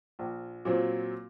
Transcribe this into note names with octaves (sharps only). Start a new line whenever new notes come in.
A#1
A#2 F#3 C4